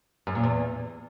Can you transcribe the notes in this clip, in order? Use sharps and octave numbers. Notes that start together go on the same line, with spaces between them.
F#2
A#2
E2